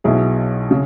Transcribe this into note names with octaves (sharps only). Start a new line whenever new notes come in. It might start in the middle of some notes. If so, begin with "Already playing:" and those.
B1 B2 E4 G#4
C#3